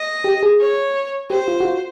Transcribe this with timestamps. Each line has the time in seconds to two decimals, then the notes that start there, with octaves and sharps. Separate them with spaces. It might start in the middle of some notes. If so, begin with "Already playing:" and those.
Already playing: D#5
0.24 G4
0.43 G#4
0.60 C#5
1.30 G4 C5
1.48 F4
1.60 F#4
1.65 F4